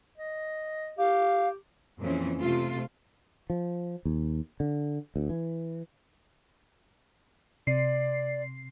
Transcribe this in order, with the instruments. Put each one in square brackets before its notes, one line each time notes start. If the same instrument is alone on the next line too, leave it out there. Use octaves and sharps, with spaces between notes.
[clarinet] D#5
[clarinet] G4 [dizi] F5
[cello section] F2 A#2 C#3 E3 C4 C#4
C3 A3 F4
[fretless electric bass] F3
D#2
D3
D2
E3
[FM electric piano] C3 C7 [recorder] D5